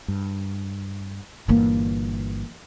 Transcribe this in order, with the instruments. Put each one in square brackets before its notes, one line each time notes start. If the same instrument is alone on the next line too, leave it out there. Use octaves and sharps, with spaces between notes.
[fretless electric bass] G2
[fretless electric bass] G1 G2 A#2 [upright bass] E3 A#3